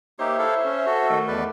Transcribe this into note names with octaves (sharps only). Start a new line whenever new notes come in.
A#3 D#4 G4 C5 C#5 E5
E4 A4 F5
C#4
F#4 A4
D#3 A3
E2 B4 D5